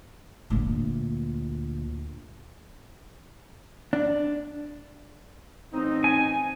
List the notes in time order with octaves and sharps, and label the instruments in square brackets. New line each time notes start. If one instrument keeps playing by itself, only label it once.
[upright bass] D2 A#2
[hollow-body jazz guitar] D4
[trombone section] A1 C4 D#4
[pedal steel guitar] G#5